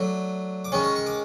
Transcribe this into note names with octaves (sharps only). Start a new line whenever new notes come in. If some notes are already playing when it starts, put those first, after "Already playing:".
Already playing: F#3 A3 D4
D6
D#3 G#3 C#4 C#6
C#6
C#6
D6